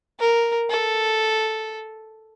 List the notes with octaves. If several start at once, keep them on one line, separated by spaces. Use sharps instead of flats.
A#4
A4